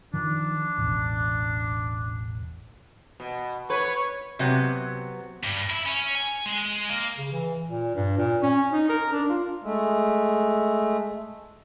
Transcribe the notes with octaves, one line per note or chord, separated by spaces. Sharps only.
D#3 F3 D4
E1 A1 E2
B2
B4 C#5
C3 F#3 B3
G2
E4
C#4
G#5
G#3
A#3
C#3
E3
A#2
G2
A#2
C#4
D#4
A#4
D4
F4
G#3 A3